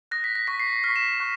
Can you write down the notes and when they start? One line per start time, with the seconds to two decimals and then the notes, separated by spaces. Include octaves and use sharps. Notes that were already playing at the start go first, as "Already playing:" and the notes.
0.11 D#6 F#6 A#6
0.24 B6
0.35 A#6
0.47 C#6 F#6 B6
0.60 C7
0.84 C#6 F6 B6
0.96 E7
1.20 C#6 F#6